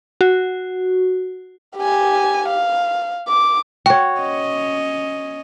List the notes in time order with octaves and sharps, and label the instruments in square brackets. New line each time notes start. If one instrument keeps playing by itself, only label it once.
[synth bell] F#4
[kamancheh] G4 G#5
F5
D6
[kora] F#4 C#5 [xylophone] G5
[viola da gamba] C#4 D#5